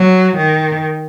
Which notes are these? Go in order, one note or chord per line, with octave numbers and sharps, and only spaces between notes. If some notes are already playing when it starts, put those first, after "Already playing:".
Already playing: F#3
D#3